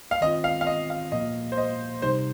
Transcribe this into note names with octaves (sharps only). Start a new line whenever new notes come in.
F5
D#3 C4 F4 D#5
F5
F5
D#5
F5
A#2 F3 A#3 D#5
C5
D#5
C3 G3 D#4 C5